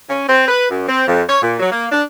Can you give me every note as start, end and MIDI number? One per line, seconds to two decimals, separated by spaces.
0.09 0.29 61
0.29 0.44 60
0.48 0.67 71
0.70 0.86 42
0.89 1.05 60
1.08 1.23 41
1.29 1.40 73
1.43 1.56 46
1.59 1.68 54
1.72 1.87 58
1.92 2.02 62